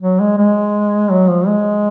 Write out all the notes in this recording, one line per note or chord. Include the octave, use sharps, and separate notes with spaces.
F#3
G#3
G#3
F#3
F3
G#3